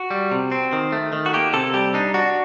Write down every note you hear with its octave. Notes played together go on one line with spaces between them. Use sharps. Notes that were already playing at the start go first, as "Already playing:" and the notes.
Already playing: F#4
G3
C3
C4
D#3
A3
D#3
F#4
A#3 G4
C3 A4
G3 G4
D4 D#4
D4 F#4